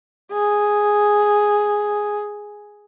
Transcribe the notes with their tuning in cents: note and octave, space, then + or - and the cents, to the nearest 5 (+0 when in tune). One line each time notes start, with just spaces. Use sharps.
G#4 +0